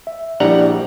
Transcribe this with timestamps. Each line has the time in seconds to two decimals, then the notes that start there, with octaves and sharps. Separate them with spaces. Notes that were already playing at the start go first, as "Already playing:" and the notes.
0.07 E5
0.40 A#1 G3 D4 E4 F#5 A#5